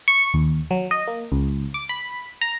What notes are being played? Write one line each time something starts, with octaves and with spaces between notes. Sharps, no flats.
C#6
D#2
F#3
D#5
A#3
C#2
D6
B5
A#5